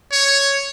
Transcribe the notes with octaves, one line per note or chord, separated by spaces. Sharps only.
C#5